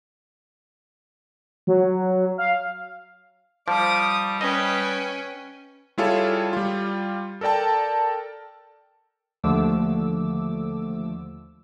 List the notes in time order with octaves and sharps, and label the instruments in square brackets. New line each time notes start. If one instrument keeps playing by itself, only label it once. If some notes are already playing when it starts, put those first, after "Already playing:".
[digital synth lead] F#3
F5
[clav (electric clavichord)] F3 [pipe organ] G3 [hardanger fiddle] D6 D#6
[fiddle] C#4 [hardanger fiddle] B4 G5 [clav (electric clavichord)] D#5
[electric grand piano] G3 E4 F4 G#4 A4 C#5
G3 F4
A4 A#4 D5 G5 A5
[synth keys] D#2 D3 F3 A3 D6 E6